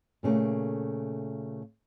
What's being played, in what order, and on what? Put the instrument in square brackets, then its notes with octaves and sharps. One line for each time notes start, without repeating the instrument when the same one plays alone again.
[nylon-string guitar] A#2 C#3 E3 A3 A#3